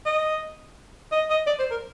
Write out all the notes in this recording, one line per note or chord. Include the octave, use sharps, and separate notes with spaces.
D#5
D#5
D#5
D5
C5
A#4